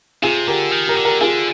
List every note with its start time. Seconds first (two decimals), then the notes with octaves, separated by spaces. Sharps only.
0.22 C3 F4 G#4
0.48 D3 G4 A#4
0.71 D#3
0.88 G4 A#4
0.97 D3
1.05 G4 A#4
1.21 D3 F4 G#4